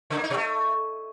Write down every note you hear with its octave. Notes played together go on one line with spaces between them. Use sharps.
C#3
A#3
D#4
B2
A3